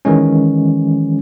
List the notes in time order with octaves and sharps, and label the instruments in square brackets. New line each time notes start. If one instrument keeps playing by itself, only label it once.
[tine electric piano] D#3 E3 G#3 C#4